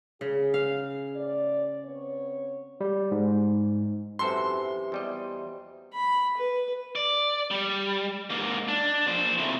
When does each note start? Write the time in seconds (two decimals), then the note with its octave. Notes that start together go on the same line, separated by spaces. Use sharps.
0.21 C#3 G#4
0.54 F5
1.15 A2 D5
1.84 B3 C4 C#5
2.81 G3
3.11 G#2
4.19 F#2 C3 E3 F#4 A4 C5 C6
4.92 E2 G3 D#5
5.94 B5
6.37 B4
6.96 D5
7.51 G3
8.30 G#2 A#3
8.68 D4
9.07 A#2 C5
9.38 A2 C3